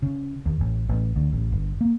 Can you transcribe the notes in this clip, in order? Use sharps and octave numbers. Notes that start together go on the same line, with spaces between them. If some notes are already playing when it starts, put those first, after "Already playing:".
C#3
D#2
A1
A1
D2
A1
G1
A#3